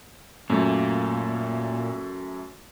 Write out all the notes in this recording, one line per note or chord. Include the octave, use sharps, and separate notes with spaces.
F#2 A#2 A3